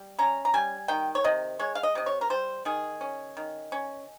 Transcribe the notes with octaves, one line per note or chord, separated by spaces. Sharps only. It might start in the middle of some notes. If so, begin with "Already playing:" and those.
Already playing: G3
C#4 A#5
A#5
G3 G#5
D#3 G5
C#5
C3 D#5
G#3 C#5
F5
D#5
C3 D#5
C#5
A#4
G3 C5
D#3 G#4
C#4
D#3
C#4